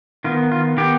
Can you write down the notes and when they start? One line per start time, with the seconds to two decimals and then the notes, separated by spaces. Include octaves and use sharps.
0.24 D#3 B3 F4
0.52 F4
0.77 D#3 B3 G4